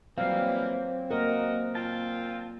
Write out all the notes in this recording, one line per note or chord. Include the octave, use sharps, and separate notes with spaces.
E3 F#3 G3 A#3 C4 F5
A#3 F#4 A#4 D#5
A#2 C4 F4 A5